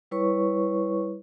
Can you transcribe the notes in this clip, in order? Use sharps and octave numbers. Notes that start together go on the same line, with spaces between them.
G3 E4 B4 C#5 C#6